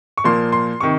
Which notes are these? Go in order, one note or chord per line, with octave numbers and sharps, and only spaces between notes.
C#6
A#2 F3 A#3 C6
C6
C3 D#3 C#6